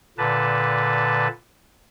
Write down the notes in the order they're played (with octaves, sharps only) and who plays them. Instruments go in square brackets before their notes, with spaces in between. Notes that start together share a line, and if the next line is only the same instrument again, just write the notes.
[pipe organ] A#2 D3 B4 A5